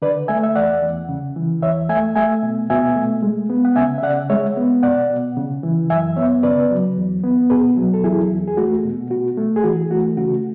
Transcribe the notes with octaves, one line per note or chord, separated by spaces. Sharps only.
D3 B4 D5
A3 E5 G#5
E5
E2 D5 F#5
E2
C#3
E3
E2 C#5 E5
A3 E5 G#5
A3 E5 G#5
B2
B2 E5 G#5
A3
G#3
B3
F#5
C#3 E5 G#5
E5
C#3 D5 F#5
G#3 C#5 E5
B3
B2 D5 F#5
B2
C#3
E3
F#2 E5 G#5
B3 C#5 E5
C#3 B4 D5
F#3
E2
B3
B2 G#4 B4
F#3
A4
E2 E4 G#4
E2
G#4
A3 F#4
B2
B2 F#4
A3
G#4
E3 F#4
A3 F#4
C#3 F#4